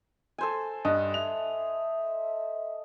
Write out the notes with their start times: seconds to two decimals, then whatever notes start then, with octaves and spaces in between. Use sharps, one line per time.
0.38 A4 C5 G#5
0.85 G2 D#5
1.14 E5 F7